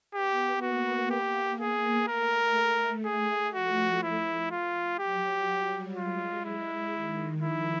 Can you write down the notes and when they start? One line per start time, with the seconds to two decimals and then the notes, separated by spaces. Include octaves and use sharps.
0.14 B3 G4
0.62 A#3 F#4
1.10 A#3 G4
1.60 G#4
2.08 A3 A#4
3.05 A3 G#4
3.53 F3 F#4
4.03 E4
4.51 F4
4.99 F#3 G4
5.48 G3
5.97 G#3 F4
6.45 G#3 E4
6.93 D#3
7.42 F3 E4